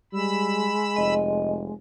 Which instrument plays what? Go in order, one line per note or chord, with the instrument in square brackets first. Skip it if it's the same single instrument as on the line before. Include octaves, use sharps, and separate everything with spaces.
[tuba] G3 [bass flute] G#3 [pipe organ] B5 E6
[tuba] F1 [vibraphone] D#5